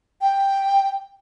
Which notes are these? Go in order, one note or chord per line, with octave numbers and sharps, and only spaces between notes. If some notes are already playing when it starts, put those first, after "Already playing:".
G5